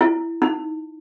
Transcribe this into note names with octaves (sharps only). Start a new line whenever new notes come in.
E4
D#4